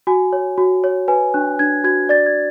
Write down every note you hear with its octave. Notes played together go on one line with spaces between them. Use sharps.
F#4 G#5
C#5
F#4
C#5
B4 G#5
D4 F#6
D4 G#6
F#4 G#6
D5 A6
G#6